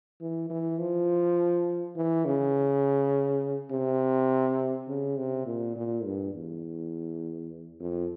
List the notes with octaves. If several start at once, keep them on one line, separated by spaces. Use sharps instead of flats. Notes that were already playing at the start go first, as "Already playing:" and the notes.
E3
E3
F3
E3
C#3
C3
C#3
C3
A#2
A#2
G2
E2
F2